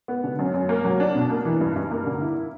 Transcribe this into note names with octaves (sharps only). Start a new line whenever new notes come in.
B3
D3
F#2
F#2
A#3
F#3
D4
B2
A#3
E3
G2
G2
A#3
D3
E4